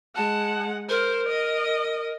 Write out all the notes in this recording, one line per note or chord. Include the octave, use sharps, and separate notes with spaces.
G#3 F#5 A5
A#4 C5
D#5